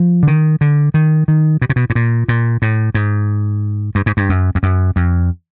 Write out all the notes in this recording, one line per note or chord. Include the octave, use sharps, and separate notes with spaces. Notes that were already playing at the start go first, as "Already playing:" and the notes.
Already playing: F3
D3
D#3
D3
D#3
D#3
B2
C3
B2
A2
A#2
A#2
A2
G#2
G2
G#2
G2
F#2
F2
F#2
F2